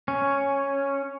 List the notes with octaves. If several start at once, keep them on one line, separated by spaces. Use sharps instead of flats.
C#4